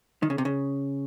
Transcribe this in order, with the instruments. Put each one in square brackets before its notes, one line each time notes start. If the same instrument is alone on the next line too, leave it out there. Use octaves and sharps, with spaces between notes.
[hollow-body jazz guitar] D#3
C#3
C3
C#3